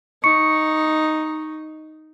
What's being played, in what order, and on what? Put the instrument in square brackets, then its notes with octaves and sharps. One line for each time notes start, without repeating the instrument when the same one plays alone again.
[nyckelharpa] D#4 [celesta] C#6 C#7